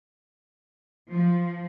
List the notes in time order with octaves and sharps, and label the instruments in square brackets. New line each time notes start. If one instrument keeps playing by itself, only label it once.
[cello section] F3